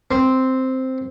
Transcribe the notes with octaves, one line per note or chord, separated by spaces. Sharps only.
C4